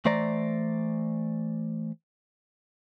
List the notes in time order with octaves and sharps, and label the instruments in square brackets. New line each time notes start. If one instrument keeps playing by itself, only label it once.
[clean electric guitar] E3 A3 C5 D5 A#5